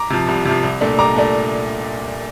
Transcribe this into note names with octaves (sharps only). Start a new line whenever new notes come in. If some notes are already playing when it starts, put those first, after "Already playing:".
Already playing: A#5 D6
C3 F3
C2
C3 F3
C2
A#2 A3 D4
C2 A#5 D6
A#2 A3 D4